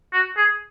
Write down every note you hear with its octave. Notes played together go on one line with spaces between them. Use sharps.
F#4
G#4